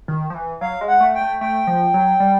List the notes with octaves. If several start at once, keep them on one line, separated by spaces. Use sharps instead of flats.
D#3
F3
E3
F#3 F5
G#3
F#5
A3
G5
A3
A3 G5
F3
F#3
G3